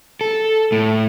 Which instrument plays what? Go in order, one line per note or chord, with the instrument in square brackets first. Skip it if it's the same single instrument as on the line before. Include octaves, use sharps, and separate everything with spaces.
[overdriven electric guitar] A4
A2